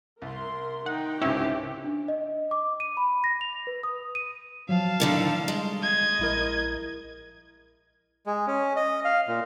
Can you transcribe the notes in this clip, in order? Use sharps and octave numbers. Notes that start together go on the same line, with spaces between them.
C2 A#4 C6
D#3 D#4 F#5 G5
C#2 G#2 C3 C#4 E4 G4 E5
D4
D#5
D6
D#7
B5
A#6
F7
B4
D#6
D#7
F3 F#3 F5 A5
A2 D3 D#3
G3 G#3
D#5 G#6
A#1 E4 A#4
G#3
C#4
D#5
F5
A#2